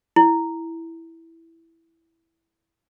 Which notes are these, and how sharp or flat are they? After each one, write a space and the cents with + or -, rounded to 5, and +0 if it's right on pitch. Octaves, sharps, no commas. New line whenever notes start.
E4 +0